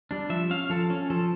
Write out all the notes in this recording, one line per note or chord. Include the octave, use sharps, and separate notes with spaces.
G3 D4
F3 E5
C#4 F5
F3 A4
C#4
F3 A4